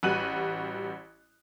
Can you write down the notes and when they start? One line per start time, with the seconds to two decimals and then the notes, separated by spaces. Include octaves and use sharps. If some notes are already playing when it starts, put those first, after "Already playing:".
0.03 A1 G3 F#4 F#6 D#7 F#7